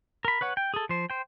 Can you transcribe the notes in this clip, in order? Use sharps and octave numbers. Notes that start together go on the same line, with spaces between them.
A#4 B5
B4 C#5 F#5
G5
G#4 A4
F3 C5
C5 G5